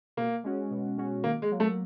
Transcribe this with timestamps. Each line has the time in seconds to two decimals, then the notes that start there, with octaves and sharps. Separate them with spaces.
0.17 B2 A#3
0.44 G#3 C#4 F#4
0.71 B2
0.98 G#3 C#4 F#4
1.24 D#3 A#3
1.42 G#3
1.51 F#3 A#3
1.60 A3